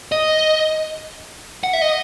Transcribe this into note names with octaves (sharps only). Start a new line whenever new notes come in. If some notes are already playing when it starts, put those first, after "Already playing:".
D#5
F#5
E5
D#5